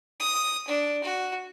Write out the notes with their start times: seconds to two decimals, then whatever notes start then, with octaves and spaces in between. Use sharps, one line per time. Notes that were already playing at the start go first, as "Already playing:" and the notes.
0.20 D#6
0.67 D4
1.04 F#4